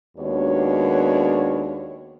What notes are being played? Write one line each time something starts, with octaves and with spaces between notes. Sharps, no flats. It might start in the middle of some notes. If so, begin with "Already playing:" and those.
D#2 G#3 B3 D4 F#4 C#5